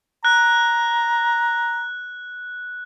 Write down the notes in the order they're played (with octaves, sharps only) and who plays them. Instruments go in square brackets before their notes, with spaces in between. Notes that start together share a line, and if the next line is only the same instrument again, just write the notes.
[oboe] A#5 [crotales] F#6